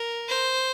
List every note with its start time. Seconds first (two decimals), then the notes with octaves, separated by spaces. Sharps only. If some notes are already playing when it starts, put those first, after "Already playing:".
Already playing: A#4
0.28 C5